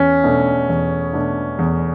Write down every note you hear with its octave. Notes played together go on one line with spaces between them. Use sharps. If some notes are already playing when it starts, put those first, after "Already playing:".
Already playing: E2 C#4
B2 A3 D4
E2
B2 A3 D4
E2